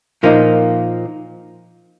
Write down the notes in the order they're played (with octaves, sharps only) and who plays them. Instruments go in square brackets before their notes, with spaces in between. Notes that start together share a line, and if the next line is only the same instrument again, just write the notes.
[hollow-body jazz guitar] A#2 F3 A#3 D#4